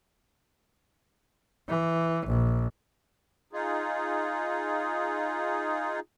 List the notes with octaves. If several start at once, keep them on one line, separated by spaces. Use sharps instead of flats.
E3
A#1
D#4 F4 G#4